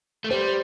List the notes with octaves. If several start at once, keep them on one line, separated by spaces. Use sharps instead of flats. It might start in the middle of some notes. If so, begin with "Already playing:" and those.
A3
G3 C5